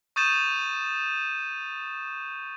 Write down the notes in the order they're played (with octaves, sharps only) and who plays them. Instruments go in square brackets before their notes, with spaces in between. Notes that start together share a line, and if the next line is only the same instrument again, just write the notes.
[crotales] C#6 D#6 G6 A6 D#7 E7